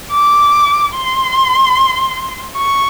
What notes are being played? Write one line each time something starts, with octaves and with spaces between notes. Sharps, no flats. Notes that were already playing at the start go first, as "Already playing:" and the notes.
D6
C6
C#6